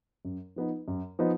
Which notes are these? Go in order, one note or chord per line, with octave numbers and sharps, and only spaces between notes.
F#2
F3 B3 D#4
F#2
F3 B3 D#4